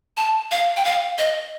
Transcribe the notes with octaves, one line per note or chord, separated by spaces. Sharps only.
A5
F5
G5
F5
D#5